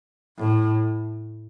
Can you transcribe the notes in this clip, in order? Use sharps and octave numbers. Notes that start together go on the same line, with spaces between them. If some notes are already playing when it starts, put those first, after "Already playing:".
A2